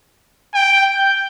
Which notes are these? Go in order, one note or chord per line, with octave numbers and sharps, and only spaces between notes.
G5
G6